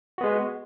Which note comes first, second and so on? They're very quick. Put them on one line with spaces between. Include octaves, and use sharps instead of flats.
F#4 B3 G#3